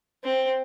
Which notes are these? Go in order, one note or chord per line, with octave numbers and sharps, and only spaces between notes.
C4